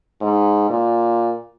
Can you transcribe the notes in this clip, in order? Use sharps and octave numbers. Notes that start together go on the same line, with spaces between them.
G#2
A#2